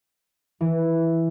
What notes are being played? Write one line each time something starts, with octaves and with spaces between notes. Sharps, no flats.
E3